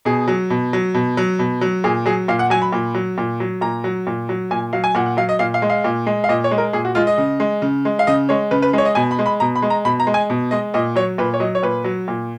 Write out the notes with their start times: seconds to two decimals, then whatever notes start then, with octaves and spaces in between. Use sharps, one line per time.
0.05 B2 G#4
0.28 F#3
0.50 B2
0.73 F#3
0.94 B2
1.17 F#3
1.39 B2
1.61 F#3
1.84 A#2 G#4
2.06 F#3 G#4
2.28 A#2 F5
2.39 F#5
2.50 F#3 G#5
2.62 B5
2.73 A#2
2.94 F#3
3.18 A#2
3.40 F#3
3.61 A#2 A#5
3.84 F#3
4.07 A#2
4.29 F#3
4.51 A#2 G#5
4.73 F#3 F5
4.84 G#5
4.95 A#2 F#5
5.06 F#5
5.17 F#3 F5
5.29 D#5
5.39 A#2 F5
5.54 F5
5.62 G#3
5.70 F5
5.84 A#2
6.06 G#3
6.24 F5
6.29 A#2 D#5
6.44 C#5
6.51 G#3
6.58 A#4
6.73 A#2 G#4
6.85 F#4
6.95 G#3 F4
7.07 D#5
7.18 C#3
7.40 G#3
7.62 C#3
7.85 G#3
7.99 F5
8.07 C#3 D#5
8.29 G#3 C#5
8.51 C#3 B4
8.62 B4
8.73 G#3 C#5
8.85 D#5
8.95 B2 G#5
9.11 B5
9.19 G#3
9.26 B5
9.40 B2 A#5
9.56 B5
9.62 G#3
9.70 A#5
9.85 B2 B5
10.00 A#5
10.07 G#3
10.14 G#5
10.30 B2
10.51 G#3 D#5
10.74 A#2 D#5
10.96 F#3 C#5
11.18 A#2 B4
11.34 C#5
11.40 F#3 D#5
11.55 C#5
11.63 A#2 B4
11.84 F#3
12.08 A#2